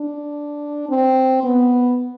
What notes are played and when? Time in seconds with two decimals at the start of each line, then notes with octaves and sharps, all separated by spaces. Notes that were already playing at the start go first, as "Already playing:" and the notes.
Already playing: D4
0.89 C4
1.44 B3